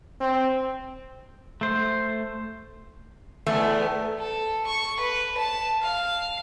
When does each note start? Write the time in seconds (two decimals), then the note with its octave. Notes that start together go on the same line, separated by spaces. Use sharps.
0.20 C4
1.61 A3 C5
3.47 E2 A3 B3 E4
4.19 A4
4.67 C#6
5.00 B4
5.38 A5
5.82 F5